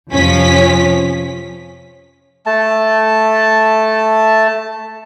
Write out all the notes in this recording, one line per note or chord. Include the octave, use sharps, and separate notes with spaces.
F2 C3 F3 C#4 B6
A3 A5